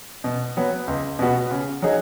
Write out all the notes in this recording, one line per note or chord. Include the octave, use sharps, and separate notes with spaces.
B2
F#3 B3
C#2
B2 B3 F#4
C#3
F#3 D#4 G#4